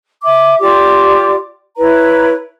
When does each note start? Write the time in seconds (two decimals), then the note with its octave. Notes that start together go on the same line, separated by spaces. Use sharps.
0.22 E5 D6
0.60 F4 G4 D5 D6
1.76 E4 B4 C#5 A#5